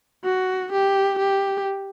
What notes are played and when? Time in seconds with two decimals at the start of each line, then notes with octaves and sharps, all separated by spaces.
0.24 F#4
0.72 G4
1.19 G4